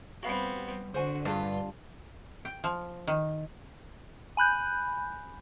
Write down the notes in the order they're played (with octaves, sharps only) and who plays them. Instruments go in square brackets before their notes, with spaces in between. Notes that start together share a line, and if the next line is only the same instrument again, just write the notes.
[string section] G3 [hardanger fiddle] B3 C4 [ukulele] F#4 F5 B5
[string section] D3 [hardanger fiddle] F#4 [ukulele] C5 G#5
[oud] G2 [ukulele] D4 G#4 [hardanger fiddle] F4
[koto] G5
F3
D#3
[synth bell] G#5 B5 F#6 G6